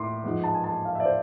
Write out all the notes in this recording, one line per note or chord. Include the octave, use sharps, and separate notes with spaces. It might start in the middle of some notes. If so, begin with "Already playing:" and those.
Already playing: A2 C6 D6
G#2 F3 G#3 B3
A5
G#5
A5
G#5
F5
E5
D5
C5